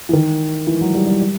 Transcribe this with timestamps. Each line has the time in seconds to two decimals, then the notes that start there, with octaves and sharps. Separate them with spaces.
0.09 E3
0.13 D#3
0.67 E3
0.81 F#3
0.95 G3
1.07 G3
1.22 G3